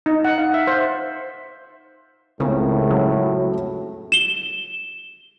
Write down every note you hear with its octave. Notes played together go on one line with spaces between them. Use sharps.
D#4
F#5
F5
E5
C5
C#2 A2 C#3 C4 A4 A#4
F#3
E7 G7